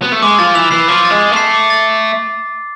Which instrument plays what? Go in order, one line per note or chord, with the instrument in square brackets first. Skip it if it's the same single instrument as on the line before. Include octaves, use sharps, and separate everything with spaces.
[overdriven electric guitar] B3
A3
[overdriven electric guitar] G#3 [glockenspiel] D6
[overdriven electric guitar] F3 [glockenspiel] A6
[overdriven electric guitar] E3 [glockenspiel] F7
[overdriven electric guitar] E3 [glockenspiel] C7
[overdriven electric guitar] F3 [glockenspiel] D6
[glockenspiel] A6
[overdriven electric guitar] G#3
[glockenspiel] F7
[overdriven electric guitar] A3
[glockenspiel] C7
D6
A6